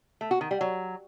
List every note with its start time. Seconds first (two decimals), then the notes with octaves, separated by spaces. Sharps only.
0.21 A3
0.31 F#4
0.41 D#3
0.51 G3
0.61 F#3